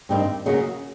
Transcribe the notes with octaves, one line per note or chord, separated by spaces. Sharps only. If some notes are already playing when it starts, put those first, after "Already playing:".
G2 D#3 G3 C4
C#3 F#3 A#3 C#4 F#4